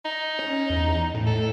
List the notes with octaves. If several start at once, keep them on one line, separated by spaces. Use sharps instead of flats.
D#4
C#4
E2
A2
A4